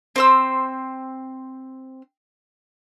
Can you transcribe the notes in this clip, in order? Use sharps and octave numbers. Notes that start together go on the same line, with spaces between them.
C4 C5 E6